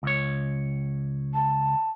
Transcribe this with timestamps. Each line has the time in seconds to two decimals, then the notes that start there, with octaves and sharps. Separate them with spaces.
0.03 C#2 C#5
1.34 A5